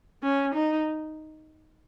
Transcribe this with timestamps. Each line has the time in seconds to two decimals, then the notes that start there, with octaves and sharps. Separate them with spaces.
0.23 C#4
0.55 D#4